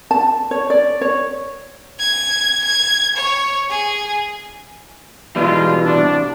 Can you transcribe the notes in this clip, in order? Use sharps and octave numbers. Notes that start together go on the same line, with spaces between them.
A5
C#5
D5
C#5
G#6
G#6
C#5
G#4
B2 E3 G3 G#3 D#4 F4
C2 A2 D4